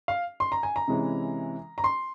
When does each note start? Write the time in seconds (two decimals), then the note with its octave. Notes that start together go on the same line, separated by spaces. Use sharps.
0.08 F5
0.40 C6
0.52 A#5
0.63 G#5
0.76 A#5
0.88 C3 E3 G#3 C#4 E4
1.78 A#5
1.84 C6